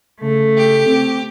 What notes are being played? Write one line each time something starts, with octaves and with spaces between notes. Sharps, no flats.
C#3 A3 A4
G4
C4